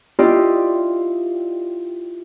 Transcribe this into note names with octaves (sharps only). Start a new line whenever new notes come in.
E4 F4 G4 D5 D#5